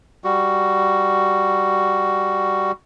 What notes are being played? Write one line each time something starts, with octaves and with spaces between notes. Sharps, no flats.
G3 F#4